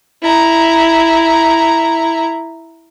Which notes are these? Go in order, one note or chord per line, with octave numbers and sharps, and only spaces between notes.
E4 A#5